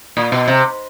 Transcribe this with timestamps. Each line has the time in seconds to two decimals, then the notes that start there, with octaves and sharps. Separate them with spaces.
0.17 A#2
0.32 B2
0.48 C3